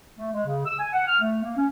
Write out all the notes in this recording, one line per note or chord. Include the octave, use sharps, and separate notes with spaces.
A3
G#3
C#3
E6
G#5
F#5
F6
A3
A#3
C#4